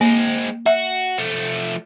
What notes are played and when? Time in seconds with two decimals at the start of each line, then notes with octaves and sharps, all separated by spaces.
0.01 G#3 A#3 C4
0.66 F#4 E5
1.18 F3 A3